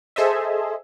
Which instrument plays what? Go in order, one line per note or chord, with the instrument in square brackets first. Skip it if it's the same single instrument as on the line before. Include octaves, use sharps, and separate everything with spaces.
[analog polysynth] G#4 A4 C5 D#5 E5